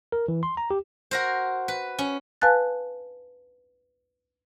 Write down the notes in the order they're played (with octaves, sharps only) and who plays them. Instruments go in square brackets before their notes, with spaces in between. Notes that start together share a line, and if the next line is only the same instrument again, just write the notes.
[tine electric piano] A#4
E3
C6
A#5
G4
[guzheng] F#4 A#4 C5
B4
C#4
[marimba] B4 F5 G#5 A5 F#6 A6